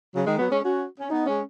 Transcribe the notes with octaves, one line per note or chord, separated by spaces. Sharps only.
C#3 F#3
D#3 G#3
F#3 B3
G#3 C#4
C#4 F#4
C#4
B3 D#4
G#3 C#4